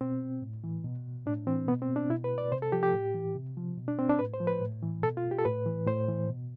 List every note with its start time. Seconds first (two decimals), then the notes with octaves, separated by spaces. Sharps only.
0.01 B2 C4
0.42 A2
0.64 E3
0.84 B2
1.26 A2 D4
1.47 E3 C4
1.68 B2 B3
1.82 C4
1.96 D4
2.10 B2 E4
2.24 B4
2.38 D5
2.52 C3 C5
2.62 A4
2.72 F3 G4
2.83 G4
2.94 A2
3.14 E3
3.35 C3
3.57 F3
3.77 B2
3.88 D4
3.99 C4
4.09 D4
4.19 A2 B4
4.34 C5
4.40 F3
4.47 B4
4.61 A2
4.83 E3
5.03 B2 A4
5.17 F4
5.31 G4
5.38 A4
5.45 A2 B4
5.66 E3
5.87 A2 C5
6.09 E3
6.29 B2